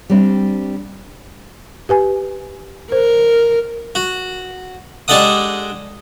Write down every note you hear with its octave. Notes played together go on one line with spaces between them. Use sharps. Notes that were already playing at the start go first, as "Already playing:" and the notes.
G3 C4 D4
G4 B4 G#5
A#4 C5
F#4
G#3 D4 G4 A4 F#5 D#6